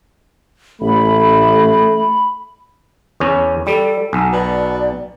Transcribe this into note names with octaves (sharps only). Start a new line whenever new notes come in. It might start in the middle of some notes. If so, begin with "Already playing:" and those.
A1 A3 B5
E2 C#4
G3 A4
B1 G#5
B2 D5